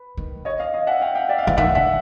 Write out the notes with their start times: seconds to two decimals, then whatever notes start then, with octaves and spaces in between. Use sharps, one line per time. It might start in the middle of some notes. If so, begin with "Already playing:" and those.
Already playing: B4
0.17 D#3
0.45 C#5 D#5
0.59 D#5 F5
0.74 D#5 F5
0.87 E5 F#5
1.01 F5 G5
1.15 F5 G5
1.29 D5 E5
1.38 F5
1.43 E5 F#5
1.47 E3
1.57 D#3 E5 F#5
1.75 D3 E5 F#5